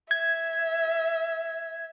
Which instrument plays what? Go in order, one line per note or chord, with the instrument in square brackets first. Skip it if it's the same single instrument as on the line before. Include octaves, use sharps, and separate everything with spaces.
[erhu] E5 [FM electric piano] G#6